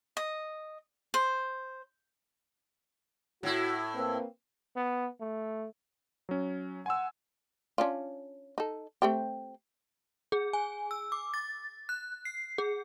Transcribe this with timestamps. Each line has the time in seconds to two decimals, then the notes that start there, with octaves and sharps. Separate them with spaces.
0.17 D#5
1.14 C5
3.43 A2 E4 F#4
3.94 A#3 C4 B4
4.77 B3
5.21 A3
6.29 F#3 C#4
6.86 F#5 G#5 C6 E6
7.78 C#4 D4 F4
8.58 D#4 A4
9.02 A3 C4 G4
10.32 G#4
10.53 G#5
10.91 E6
11.12 D6
11.34 A6
11.89 F#6
12.25 C7
12.58 G#4